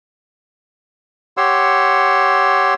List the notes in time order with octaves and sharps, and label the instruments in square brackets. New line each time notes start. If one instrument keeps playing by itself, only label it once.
[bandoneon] G4 C#5 F#5 C6 E6